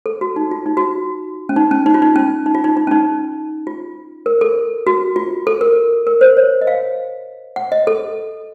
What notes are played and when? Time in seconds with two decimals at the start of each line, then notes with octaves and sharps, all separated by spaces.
0.06 A4
0.21 F#4
0.36 D#4
0.51 F4
0.66 D#4
0.77 F#4
0.82 F4
1.49 C#4
1.56 D#4
1.71 C#4
1.86 D#4
1.94 F4
2.02 D#4
2.16 C#4
2.46 D#4
2.55 F4
2.64 D#4
2.77 D#4
2.87 C#4
2.91 D#4
3.67 F4
4.26 A#4
4.41 A4
4.87 F#4
5.16 F4
5.47 A4
5.61 A#4
6.07 A#4
6.21 C5
6.37 C#5
6.61 D#5
6.67 F5
7.56 F#5
7.72 D#5
7.87 A4